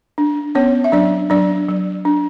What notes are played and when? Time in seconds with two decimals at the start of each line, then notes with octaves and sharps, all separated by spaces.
0.18 D4
0.55 B3 C#4 C#5
0.84 E5
0.92 F#3 D4 D5
1.30 F#3 D4 D5
1.69 F#3
2.05 D4